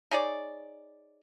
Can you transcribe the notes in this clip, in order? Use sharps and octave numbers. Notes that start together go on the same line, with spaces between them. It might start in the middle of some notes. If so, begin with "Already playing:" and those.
D#4 G#4 C#5 D5